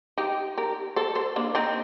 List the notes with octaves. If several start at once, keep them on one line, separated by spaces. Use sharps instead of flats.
D#4 G4
G4 A#4
A4 C5
A4 C5
A#3 D4
C4 D#4